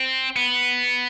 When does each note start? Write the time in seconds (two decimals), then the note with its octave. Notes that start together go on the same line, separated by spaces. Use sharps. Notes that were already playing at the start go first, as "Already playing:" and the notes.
Already playing: C4
0.36 B3